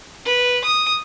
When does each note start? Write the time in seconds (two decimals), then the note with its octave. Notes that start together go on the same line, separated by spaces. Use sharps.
0.25 B4
0.64 D#6